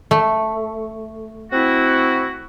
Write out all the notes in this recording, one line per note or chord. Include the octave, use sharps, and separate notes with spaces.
A3
C4 E4 F#4